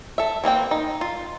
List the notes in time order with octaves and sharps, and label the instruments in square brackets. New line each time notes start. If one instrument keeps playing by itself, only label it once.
[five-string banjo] A4 E5
E3 A#3 C4 G5
D#4
F4